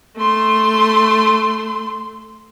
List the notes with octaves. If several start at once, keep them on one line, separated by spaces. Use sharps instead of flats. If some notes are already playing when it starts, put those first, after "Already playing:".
A3 C6